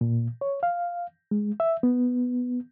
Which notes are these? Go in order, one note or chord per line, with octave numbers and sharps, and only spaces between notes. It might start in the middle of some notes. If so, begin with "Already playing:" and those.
A#2
C#5
F5
G#3
E5
B3